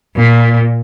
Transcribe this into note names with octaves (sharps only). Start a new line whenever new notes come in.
A#2